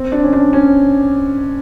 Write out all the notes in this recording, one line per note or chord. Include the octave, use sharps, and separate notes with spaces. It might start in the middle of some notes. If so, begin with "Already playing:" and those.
Already playing: C4
D4
C#4
D4
C#4